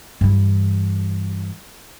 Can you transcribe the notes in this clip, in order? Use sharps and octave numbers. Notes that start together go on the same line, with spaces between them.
G2 E3